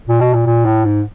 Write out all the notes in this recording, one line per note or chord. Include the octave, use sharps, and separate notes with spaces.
A#2
B2
A#2
A#2
A2
G#2